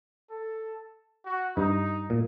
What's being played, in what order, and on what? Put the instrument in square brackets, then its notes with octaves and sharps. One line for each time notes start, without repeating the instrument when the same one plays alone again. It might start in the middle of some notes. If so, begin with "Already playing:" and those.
[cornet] A4
F#4
[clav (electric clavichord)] G2 [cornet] D#4
[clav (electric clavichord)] A#2